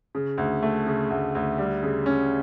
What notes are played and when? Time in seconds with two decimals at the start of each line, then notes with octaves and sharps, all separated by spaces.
0.15 C#3
0.38 D2
0.63 A3
0.86 C#3
1.10 D2
1.35 D2
1.58 G3
1.83 C#3
2.06 C#4